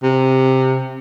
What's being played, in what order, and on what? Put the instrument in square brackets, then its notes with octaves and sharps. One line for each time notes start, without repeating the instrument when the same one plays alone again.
[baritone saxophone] C3